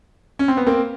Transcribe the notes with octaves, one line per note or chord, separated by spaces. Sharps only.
C#4
C4
B3
A#3 C4